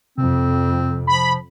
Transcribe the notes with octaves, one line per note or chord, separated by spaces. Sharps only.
F2 C3 C4
F3 B5